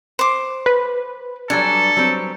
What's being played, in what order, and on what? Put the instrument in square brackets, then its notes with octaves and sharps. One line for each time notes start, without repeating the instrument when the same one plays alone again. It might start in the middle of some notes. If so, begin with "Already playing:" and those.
[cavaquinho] C5 D6
[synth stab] B4
[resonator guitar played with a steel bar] F#3 G3 D4 [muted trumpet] A4 [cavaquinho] G#5
[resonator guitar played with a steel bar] F#3 G3 C4